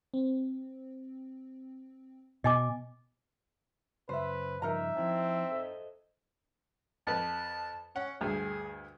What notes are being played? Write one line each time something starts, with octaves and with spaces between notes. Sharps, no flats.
C4
B2 D#5 G#5 D6
F#2 C#3 B4 C5 E5
G2 C#3 F3 D#4 A#4 E5 A#5
F3 C4 E4 A5
A4 C5 D#5
F2 B4 A5
C#4 F#5
D2 G2 G#4